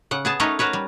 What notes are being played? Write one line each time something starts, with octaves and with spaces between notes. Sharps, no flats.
C#3 F#5
B3 G#4 A5
A3 C#4 D#4 A#4 B4 C#5
F#4 A#4 B4 C#5
G3